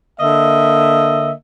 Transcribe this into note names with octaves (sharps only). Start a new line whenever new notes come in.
D3 A#3 D#5 E5